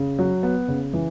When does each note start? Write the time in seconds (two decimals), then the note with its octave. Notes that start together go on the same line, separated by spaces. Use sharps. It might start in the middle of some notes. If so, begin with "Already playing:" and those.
Already playing: C#3
0.19 F#3
0.43 B3
0.68 C#3
0.93 E3